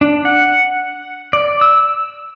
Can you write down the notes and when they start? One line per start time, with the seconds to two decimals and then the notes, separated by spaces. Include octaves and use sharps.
0.01 D4
0.25 F#5
1.33 D5
1.61 E6